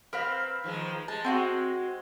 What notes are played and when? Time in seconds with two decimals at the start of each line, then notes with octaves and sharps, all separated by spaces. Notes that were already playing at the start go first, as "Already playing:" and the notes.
0.13 C4 A#4 B4 F5
0.64 D#3 F3 G#3
1.08 G#3 A5
1.24 C4 F4 F#4